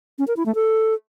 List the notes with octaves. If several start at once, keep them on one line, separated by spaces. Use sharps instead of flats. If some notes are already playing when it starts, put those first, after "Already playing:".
C#4
A#4
E4
A3
A4